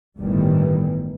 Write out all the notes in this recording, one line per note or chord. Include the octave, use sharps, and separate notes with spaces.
G1 A2 D#3 E3 G3